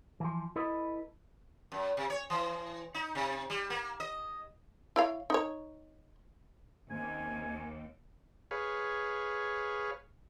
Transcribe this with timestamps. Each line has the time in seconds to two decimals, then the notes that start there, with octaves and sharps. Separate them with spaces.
0.20 E3 F3
0.56 E4 A4 B4 D#5
1.72 F#2
1.97 C3
2.10 C#5
2.30 E3
2.94 D#4
3.15 C3
3.50 G3
3.70 A#3
4.00 D#5
4.96 E4 C#5 F5
5.30 D#4 C#5
6.90 D#2 C3 C#4 G#5
8.51 G#4 B4 C#5 F5